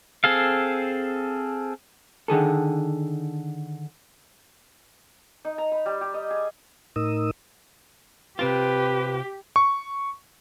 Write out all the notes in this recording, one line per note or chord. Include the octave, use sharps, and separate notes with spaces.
C4 G#4 A4 F5
D3 D#3 G#4 A4
D#4
A#5
B5
G3
G4
D#5
G#4
A2 D#4 A#4 D#6 E6
C3 C4 F4 G4 B4
C#6